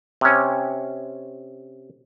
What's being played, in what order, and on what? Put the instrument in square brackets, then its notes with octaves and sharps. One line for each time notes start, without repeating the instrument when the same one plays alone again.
[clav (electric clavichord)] C3 C#4